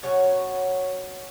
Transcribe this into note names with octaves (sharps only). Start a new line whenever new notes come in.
B2 F#3 C#4 C#5